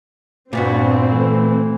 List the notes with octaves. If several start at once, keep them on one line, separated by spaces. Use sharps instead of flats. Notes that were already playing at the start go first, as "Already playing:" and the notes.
G2 A#2 B3 C4 F#4
E3 A3